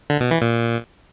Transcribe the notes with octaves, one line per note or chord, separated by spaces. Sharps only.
D3
B2
E3
A#2